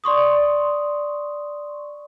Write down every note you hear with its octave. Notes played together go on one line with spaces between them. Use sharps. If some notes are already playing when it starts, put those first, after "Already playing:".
D5 C6 C#6 D#6